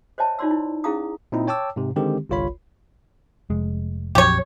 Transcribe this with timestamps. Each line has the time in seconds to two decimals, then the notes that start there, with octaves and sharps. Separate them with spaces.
0.18 C5 C#5 D#5 E5 G#5 A5
0.39 D#4 F4 C#5 D5 C6 E6
0.51 E4
0.84 C#4 E4 G#4 F5 A#5 D#6
1.32 A#2 C4 D#4 E4
1.48 C#5 G5 A5 D6 E6
1.76 G#2 C3
1.96 D3 D#3 G#3 C4 G4
2.29 G1 C2 F4 C#5 B5
3.50 F1 G#3
4.15 A#1 F2 F#3 G4 C#5